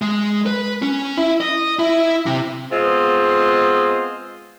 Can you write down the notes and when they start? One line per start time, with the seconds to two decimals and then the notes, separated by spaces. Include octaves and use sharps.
0.02 G#3
0.46 B4
0.82 C#4
1.17 E4
1.41 D#5
1.79 E4
2.26 C3
2.72 G#3 B3 C4 F4 C5 D#5